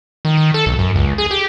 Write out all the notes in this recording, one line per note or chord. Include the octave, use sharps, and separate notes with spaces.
D#3
D#3
A4
B1
F#2
C#2
G#4
G4